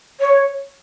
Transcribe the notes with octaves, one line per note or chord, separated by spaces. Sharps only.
C#5